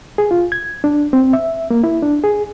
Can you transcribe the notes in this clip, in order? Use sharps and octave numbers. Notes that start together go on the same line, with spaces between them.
G#4
F4
G#6
D4
C4
E5
A#3
E4
D4
G#4